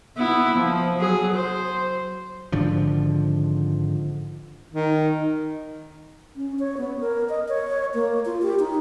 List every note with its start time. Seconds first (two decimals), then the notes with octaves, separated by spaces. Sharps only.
0.17 B3 E4
0.56 F3
0.97 F#3 G#4
1.33 C5
2.52 G#1 G#2 D3 F3
4.74 D#3
6.36 C#4
6.59 C#5
6.78 B3
7.00 A#4
7.29 D#5
7.48 C#5
7.94 A#3
8.25 F4
8.42 G4
8.60 D#4